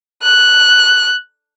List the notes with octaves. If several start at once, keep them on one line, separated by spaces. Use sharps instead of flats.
F#6